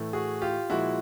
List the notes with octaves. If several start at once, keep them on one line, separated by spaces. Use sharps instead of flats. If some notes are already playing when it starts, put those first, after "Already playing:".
Already playing: A2 E3 A3
F#4 G#4
F4 G4
A#2 F3 G#3 E4 F#4